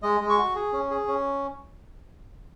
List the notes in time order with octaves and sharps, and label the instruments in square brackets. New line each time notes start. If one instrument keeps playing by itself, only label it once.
[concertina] G#3 D#5
G#3
C#6
F#4
G#4
C#4
G#4
C#4